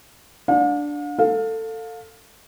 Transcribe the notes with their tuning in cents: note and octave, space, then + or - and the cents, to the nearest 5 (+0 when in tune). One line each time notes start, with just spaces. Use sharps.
D4 +0 F5 +45
A4 +20 F5 +20